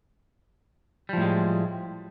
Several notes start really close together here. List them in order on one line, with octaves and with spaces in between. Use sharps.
G3 F3 A2 G#3